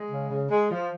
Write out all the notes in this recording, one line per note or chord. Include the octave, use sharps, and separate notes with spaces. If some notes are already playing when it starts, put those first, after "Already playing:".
Already playing: G#3
C#3
C#3
G#3
F3